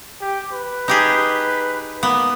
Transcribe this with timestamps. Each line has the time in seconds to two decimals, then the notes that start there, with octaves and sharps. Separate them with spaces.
0.21 G4
0.52 B4
0.88 D#4 G4 G#4
2.03 A#3 B3